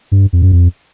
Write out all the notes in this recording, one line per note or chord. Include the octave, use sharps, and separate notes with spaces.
G2
F2
F#2
F2